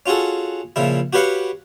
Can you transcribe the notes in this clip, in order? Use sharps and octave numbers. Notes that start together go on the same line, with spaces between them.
C#4 F4 F#4 G#4 A4
A#2 C#3 F3 E4
F#4 G4 B4 C#5 F5 F#5